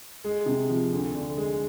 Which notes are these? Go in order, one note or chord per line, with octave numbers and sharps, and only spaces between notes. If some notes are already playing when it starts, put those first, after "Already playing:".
G#3
C3
F3
D2
D3
G#3